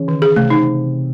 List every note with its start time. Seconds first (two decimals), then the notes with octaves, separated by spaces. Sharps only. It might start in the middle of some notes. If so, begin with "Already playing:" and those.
Already playing: C#3 E3 C#4
0.08 D#3
0.22 G#4
0.36 C3 A3
0.50 D#4